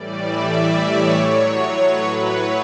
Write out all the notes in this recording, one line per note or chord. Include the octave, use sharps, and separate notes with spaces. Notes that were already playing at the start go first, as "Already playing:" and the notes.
Already playing: A2 E3 G3 D5
E5
D5
C#5
A2 F#3
B4
C#5